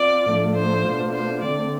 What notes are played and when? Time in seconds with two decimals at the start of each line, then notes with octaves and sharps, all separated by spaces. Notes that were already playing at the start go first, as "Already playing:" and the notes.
Already playing: C4 F4 D5
0.26 A2 F3 A3 D4
0.55 C5
0.85 B2 A3 D4 F4
1.13 C5
1.42 D3 A3 C4 D5